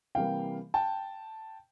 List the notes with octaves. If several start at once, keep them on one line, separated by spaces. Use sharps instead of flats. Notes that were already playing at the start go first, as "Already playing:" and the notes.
C3 E3 G3 A#3 F5 G5
G5 A5